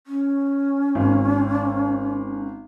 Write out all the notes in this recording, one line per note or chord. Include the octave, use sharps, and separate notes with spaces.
C#4
G#1